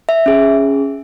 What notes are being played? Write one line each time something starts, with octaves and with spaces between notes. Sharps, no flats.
E5
C#4 G#4